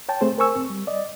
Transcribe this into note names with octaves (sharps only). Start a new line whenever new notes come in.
C#5 G5 A5
A3 C4 G#4 C5
A#4 C5 G#5 C#6 E6
C4
G3
D5 D#5